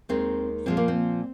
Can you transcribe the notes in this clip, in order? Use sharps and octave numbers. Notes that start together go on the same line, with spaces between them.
D#2 D#3 G#3 C4
A#2 F3 G#3 C4
A#3
C4